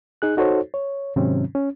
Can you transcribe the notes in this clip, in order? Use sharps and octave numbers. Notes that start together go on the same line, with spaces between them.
D#4 G#4 F#6
D#4 F#4 A4 C5 C#5
C#5
G#2 C3 D#3 F#3 C4 C#4
C#4